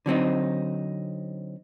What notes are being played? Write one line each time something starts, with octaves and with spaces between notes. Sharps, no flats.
D3 F#3 C4 D#4